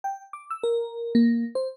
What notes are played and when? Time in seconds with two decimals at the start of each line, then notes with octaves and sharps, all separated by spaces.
0.04 G5
0.33 D6
0.50 E6
0.63 A#4
1.15 A#3
1.55 C5